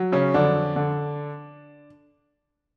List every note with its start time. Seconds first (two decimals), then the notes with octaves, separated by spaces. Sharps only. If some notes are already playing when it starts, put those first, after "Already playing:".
Already playing: F#3
0.12 C#3 C#4
0.34 F2 D3 D4
0.76 D3